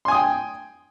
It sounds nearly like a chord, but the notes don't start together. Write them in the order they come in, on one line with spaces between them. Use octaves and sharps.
C6 G#5 D#6 G5